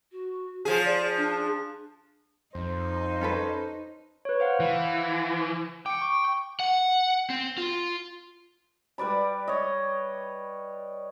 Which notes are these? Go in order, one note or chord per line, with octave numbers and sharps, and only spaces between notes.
F#4
F3 G#4 C#5
D5
D4
F2 D#4 C5
C#4 A4 B4
B4 C#5
C5 F5 F#5
E3
G5 D6 C#7
C#6
F#5
C4
F4
G3 B4 D5 B5
C#5 D#5